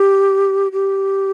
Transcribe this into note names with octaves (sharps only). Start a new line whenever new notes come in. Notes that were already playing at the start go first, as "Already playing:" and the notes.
Already playing: G4
G4